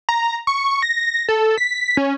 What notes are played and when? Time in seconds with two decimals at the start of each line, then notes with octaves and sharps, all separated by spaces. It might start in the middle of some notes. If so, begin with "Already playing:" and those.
0.09 A#5
0.47 C#6
0.82 A#6
1.29 A4
1.58 B6
1.97 C#4